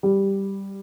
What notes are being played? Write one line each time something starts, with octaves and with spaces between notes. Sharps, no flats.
G3